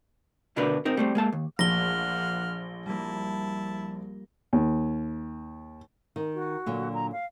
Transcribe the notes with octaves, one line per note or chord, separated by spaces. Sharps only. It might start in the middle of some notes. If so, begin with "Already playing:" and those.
D2 B2 D4 A#4 B4 D5
C4 D#4 A#4
G3 A3 C4
G#3 A#3 A5
D#2
A#1 F3 A3 A#3 F#5 F6 A#6 G7
G3 A#3 E4 A5
D#2
D#3
F#4
A#2 D3 F#3
A#5
F5